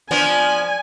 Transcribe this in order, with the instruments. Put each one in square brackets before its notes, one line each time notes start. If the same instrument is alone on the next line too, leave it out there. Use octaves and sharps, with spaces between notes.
[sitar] F3 B3 D4 [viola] G#5